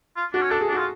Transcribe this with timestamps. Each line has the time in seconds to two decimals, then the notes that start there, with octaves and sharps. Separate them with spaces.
0.17 F4
0.33 D4 F#4
0.42 C#4
0.51 D4 A4
0.61 G#4
0.68 D4
0.73 F4 F#4